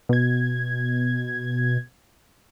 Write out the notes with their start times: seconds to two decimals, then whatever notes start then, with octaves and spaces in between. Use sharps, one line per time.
0.09 B2 G#6